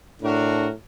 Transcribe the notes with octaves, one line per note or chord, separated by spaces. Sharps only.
A2 D4 F#4 A#4